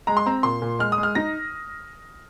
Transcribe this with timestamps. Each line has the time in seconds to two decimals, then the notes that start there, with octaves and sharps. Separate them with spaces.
0.07 G#3 A#5
0.17 C6
0.26 C4 A#5
0.43 A#2 C6
0.62 A#2
0.79 G#3 F6
0.92 D#6
0.98 G#3
1.03 F6
1.15 D#4 A#6